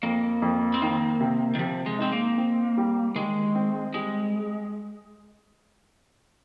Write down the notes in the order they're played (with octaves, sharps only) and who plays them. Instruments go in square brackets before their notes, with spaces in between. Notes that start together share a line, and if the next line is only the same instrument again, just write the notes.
[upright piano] F2 [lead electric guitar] A#3
[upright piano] F2
[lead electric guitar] C4
[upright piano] D#3 [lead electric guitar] A#3
[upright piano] C3
[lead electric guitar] D#3
[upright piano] C3 [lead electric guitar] F3
[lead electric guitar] G#3
[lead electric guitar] C4 [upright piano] D#4
[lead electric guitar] A#3
[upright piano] C4
G3
[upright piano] D#2 [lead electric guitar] G#3
[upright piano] C4
[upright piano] G3 [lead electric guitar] G#3